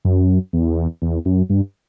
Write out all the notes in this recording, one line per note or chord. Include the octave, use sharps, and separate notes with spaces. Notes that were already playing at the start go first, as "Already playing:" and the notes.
F#2
E2
E2
F#2
G2